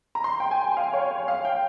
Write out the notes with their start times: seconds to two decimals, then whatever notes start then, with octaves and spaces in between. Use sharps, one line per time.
0.15 A#5
0.24 C6
0.40 G5
0.51 G#5
0.77 F5
0.93 C#5
1.11 C#5
1.28 F5
1.45 G5